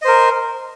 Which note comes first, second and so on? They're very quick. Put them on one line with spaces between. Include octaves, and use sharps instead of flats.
D#5 C5 A#4